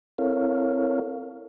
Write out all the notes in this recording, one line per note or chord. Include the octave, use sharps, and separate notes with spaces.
C4 E4 A4 A#4 C#5 F5